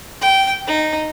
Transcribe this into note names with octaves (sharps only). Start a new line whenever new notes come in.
G5
D#4